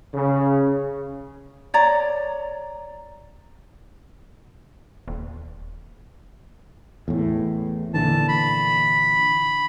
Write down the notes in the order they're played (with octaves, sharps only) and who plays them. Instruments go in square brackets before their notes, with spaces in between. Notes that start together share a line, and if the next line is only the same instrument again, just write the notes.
[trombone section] C#3
[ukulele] C#5 D5 A#5
[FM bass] D#1
[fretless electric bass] E2 A2
[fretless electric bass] A#2 D3 E3 [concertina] A5
[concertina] B5